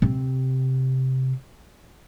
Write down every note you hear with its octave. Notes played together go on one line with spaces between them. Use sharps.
C3 C4